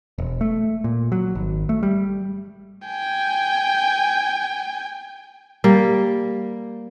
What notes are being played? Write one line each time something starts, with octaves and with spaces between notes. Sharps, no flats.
E1
A3
A#2
F#3
G#1
A3
G3
G5 G#5
G3 A#3